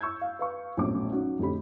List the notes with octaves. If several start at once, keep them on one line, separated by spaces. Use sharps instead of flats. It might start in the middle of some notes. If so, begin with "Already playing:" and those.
C#6 E6 G6 G#6
F5
B4 F5 C#6
A#1 E2 A2 F#3 C#4 D6
F#3 C#4 D#4 F#4
F2 A2 D3 G4 B5